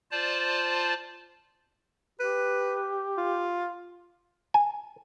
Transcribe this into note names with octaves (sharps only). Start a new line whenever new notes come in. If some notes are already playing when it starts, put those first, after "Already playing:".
F4 C5 D5 A5
G4 B4
F4
G#5